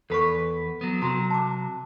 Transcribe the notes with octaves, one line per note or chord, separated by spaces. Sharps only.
E2 A4 B4 B5 C#6
F#3 B3
C3 F#3 F#4 A#5 C6
A5 D6